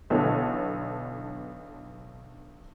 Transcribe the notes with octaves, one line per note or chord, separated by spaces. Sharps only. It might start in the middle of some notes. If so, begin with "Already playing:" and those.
B1 D3 E3 B3 A4 C#5